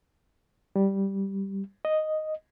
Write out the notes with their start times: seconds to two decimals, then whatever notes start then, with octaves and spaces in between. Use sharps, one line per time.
0.76 G3
1.85 D#5